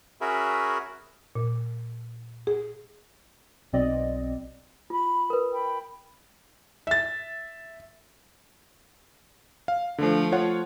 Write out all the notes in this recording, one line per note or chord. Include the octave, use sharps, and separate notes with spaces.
C#4 F#4 G#4 A#4 E5 B5
A#2
G#4
B1 B2 C4 D5 D#5
F4 B5
A#4 B4
G5 B5
E5 A6
F5
D3 F3 A3
F4 C#5 F#5